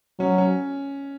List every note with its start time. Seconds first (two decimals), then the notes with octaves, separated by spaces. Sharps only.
0.19 F#3 C#4
0.38 C#4